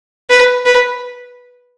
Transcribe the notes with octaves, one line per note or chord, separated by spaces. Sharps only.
B4
B4